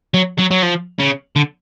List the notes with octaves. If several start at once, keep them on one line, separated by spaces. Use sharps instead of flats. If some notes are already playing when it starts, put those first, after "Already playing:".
F#3
F#3
F#3
F3
C#3
D3